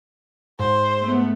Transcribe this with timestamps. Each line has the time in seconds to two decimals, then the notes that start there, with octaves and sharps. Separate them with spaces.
0.59 G#2 C5
1.02 A3 B3